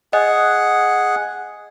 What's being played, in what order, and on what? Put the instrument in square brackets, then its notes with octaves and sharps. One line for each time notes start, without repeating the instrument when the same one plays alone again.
[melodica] G#4 F#5 [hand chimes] D#5